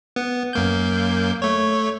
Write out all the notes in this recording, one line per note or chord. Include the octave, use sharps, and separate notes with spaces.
B3
F#2 A#3 G6
A3 C#5